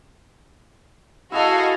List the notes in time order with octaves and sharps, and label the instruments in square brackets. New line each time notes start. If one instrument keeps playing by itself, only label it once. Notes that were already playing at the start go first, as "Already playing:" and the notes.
[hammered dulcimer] E4 G#4 A4 [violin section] F#4 D#5 F5